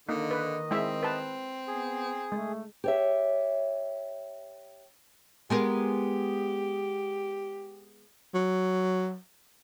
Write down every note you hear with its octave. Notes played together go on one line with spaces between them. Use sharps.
D3 D#3 A#3 D#4 D#5
B4
G#3 C4 E4 E5
B4 A5
B3 G#4
G#3 A3
G4 C#5 E5
G#3 B3 G4 A#4
F#3